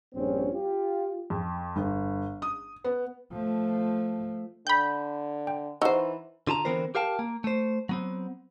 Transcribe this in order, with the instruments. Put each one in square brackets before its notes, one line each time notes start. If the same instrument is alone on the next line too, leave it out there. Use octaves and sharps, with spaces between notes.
[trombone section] A#1 G2 C4 C#4
F4 G4
[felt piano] F2
G1
D#6
B3
[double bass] F3 A3
[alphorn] D3 [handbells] G5 [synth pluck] B5 G6
[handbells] G5
[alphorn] E3 [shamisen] D#4 C5 [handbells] F#5 C#6 E6
[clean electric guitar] D3 F4 A5 A#5
D3 E3 B3 C4 A#4 C5
G4 A#4 F5 G5 A5
A#3
A3 C5
F#3 B3 C4